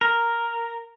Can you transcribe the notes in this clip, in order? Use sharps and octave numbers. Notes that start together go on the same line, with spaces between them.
A#4